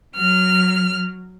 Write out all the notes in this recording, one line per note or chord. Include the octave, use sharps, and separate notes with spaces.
F#3 F6